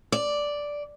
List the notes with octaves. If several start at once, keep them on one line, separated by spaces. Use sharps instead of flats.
D5